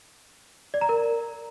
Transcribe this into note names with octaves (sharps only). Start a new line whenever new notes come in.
D5
A#5
A#4